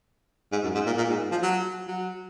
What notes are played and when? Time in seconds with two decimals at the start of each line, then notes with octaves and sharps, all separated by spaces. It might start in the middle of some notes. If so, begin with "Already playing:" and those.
0.52 G#2
0.64 F#2
0.75 G#2
0.86 A#2
0.98 A#2
1.09 G#2
1.31 F3
1.43 F#3
1.88 F#3